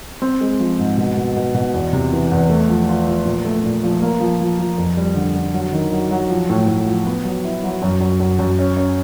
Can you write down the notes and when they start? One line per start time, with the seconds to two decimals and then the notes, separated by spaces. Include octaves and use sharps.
0.22 C4
0.41 G#3
0.60 F3
0.79 G#2
0.98 B2
1.17 B2
1.36 B2
1.55 B2
1.74 E2
1.93 C3
2.13 E3
2.32 E2
2.50 A3
2.69 F3
2.89 F4
3.07 F3
3.25 A#2
3.45 A3
3.64 A#2
3.84 F3
4.02 A#3
4.20 F3
4.41 F3
4.59 F3
4.78 F2
4.97 G3
5.15 D3
5.35 D3
5.54 F#3
5.73 D#3
5.93 F#3
6.11 F#3
6.30 F3
6.50 A2
6.68 A2
6.87 F3
7.06 B3
7.25 F#3
7.44 E4
7.64 F#3
7.82 F#2
8.01 F#2
8.20 F#2
8.39 F#2
8.59 C#4
8.77 C#4